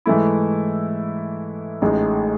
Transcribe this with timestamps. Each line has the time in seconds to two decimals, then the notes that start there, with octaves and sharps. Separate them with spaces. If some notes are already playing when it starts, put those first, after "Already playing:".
0.06 G#2 E3 A3 E4
1.82 A1 A2 G#3 D#4